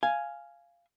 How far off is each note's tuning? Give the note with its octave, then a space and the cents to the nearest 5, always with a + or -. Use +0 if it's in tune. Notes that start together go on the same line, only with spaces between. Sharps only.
F5 -10 G#5 +5